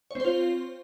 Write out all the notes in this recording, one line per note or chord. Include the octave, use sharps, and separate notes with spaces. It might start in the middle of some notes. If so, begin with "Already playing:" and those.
C4 F4 C5 C#5